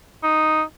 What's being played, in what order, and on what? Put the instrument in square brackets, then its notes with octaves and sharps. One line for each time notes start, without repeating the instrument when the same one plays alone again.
[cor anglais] D#4